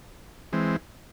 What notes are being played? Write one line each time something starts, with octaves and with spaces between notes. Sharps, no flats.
E3 G#3 C4